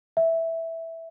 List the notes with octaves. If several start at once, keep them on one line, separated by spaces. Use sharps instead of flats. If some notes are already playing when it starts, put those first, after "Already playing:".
E5